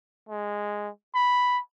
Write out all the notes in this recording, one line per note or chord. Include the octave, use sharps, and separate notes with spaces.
G#3
B5